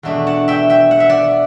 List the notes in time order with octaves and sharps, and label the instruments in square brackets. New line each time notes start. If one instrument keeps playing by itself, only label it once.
[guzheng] E2 B2 A3 D4
F#5 A5
E5 G5
E5 G5
F#5
E5
D5 F#5